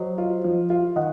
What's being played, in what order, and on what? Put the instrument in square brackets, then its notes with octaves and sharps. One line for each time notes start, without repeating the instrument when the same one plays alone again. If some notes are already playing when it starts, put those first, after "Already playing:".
Already playing: [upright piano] F#3 [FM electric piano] C5 D#5
[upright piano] F4
F3
F4
[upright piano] D#3 [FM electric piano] D#5 F#5